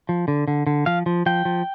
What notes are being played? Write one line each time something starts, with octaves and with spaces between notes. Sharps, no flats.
F3
D3
D3
D3
F3 F5
F3
F3 G5
F3